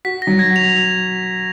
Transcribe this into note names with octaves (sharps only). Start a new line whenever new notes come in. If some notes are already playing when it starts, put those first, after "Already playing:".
F#4 B6
A#6
F#3
G#6
F#4 F7